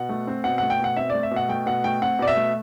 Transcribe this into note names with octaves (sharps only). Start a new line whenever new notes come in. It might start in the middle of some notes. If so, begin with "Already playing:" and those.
Already playing: B2 F#5
A3
C4
B2 F#5
A3 F#5
G5
B2 F#5
C4 E5
A3 D5
E5
B2
F#5
A3 G5
B2 F#5
A3 G5
C4 F#5
B2 D5
E5
A3